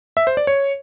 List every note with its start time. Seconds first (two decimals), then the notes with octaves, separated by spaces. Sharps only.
0.17 E5
0.27 C5
0.37 D5
0.47 C#5